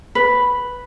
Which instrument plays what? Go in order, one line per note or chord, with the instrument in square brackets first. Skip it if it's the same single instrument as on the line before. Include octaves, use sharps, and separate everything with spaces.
[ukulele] B4